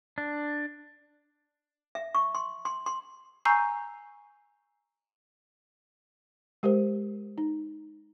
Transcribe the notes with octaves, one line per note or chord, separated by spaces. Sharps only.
D4
E5
C#6
C6
C6
C6
G#5 A#5 C#6 E6 G6 C7
G#3 G4 A#4 C5
D#4